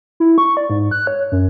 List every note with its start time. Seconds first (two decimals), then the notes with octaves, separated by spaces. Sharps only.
0.20 E4
0.38 C#6
0.57 D5
0.70 G#2
0.91 F#6
1.07 C#5
1.32 F#2